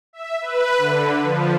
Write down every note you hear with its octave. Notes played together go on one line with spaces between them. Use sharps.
E5
B4
D3
F3